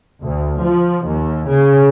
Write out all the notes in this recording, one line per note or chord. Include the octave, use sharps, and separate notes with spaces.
D2
F3
D#2
C#3